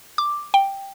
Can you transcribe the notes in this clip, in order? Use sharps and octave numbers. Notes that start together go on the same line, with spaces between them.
D6
G5